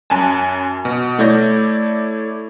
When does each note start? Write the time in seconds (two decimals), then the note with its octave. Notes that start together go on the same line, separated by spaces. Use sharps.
0.10 F#2 G#5 A5
0.85 B2
1.18 A3 E4 C#5 D5 G6 A#6